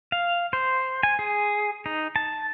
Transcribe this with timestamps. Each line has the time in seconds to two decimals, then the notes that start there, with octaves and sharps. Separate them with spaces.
0.12 F5
0.53 C5
1.03 G#5
1.19 G#4
1.86 D#4
2.16 A5